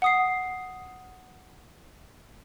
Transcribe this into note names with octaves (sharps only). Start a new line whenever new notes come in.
F#5 D#6 C7